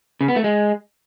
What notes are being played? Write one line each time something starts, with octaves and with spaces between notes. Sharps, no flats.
C#3
B3
A3
G#3